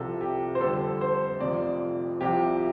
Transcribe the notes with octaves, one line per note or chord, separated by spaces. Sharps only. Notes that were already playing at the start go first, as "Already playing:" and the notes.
Already playing: C2 C3 F3 A4
G4
C5
F2 D3 G3 A4
C5
F1 F2 C3 F3 D5
C2 C3 F3 G4